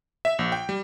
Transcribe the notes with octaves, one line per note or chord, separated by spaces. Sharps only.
E5
A#1
G5
G3